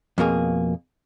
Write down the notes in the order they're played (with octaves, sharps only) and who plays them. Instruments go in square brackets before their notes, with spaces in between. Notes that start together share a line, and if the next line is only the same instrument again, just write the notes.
[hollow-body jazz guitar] F2 B2 A#3 G#4